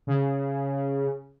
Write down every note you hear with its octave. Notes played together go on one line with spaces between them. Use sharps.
C#3